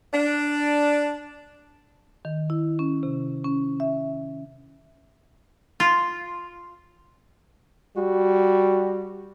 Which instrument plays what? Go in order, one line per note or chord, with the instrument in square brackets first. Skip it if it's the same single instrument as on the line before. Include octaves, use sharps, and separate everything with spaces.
[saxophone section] D4
[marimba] D#3
E4
C#4
C3
C#4
E5
[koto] F4
[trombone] G3 [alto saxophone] F#4